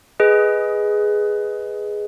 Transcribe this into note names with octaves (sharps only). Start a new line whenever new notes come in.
G#4 B4 D#5